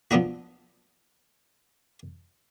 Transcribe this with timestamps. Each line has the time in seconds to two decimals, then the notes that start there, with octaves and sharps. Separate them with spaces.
0.11 F3 B3 D4 D#4 F#4